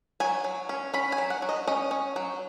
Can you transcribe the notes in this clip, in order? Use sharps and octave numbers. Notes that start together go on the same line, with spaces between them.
F#3 G#5
F#3
C#4
C#4 B5
G#5
F#3
F#5
F#3
D#5
C#4 D#5
C#4
F#3